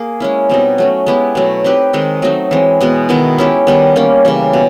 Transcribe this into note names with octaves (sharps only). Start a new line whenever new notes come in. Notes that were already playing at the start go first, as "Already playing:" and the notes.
Already playing: A#3 G#4
G#3 C#4 E4
B2 G3 C4 D#4
F#3 A3 C#4
G#3 B3 E4 G4
B2 F#3 A3
C4 D#4 G4 B4
D#3 G#3 C4
F#3 A3 C4 D#4
E3 G#3 C4
B2 G#3 B3
D#3 G#3 B3 E4
G#3 C#4 E4 G4
D#3 G3 B3
G3 A#3 C#4
C#3 E3 G3
B2